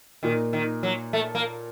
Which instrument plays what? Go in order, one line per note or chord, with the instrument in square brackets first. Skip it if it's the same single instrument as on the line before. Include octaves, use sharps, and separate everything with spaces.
[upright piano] A#2 [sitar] D#3
[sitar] D#3
F#3
A3
A#3